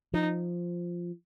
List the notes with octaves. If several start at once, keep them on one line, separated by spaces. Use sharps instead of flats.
F3 D#4